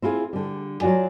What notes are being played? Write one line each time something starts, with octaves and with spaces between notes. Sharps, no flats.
C4 E4 F4 G#4
D3 G3
F#3 F4 F#4 D5 G#5